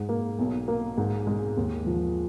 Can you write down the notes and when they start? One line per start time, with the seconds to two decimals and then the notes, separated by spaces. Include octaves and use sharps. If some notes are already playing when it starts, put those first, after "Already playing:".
Already playing: G#2
0.09 A#3
0.39 B1
0.68 A#3
0.98 G#2
1.27 G#3
1.57 D#2
1.86 F3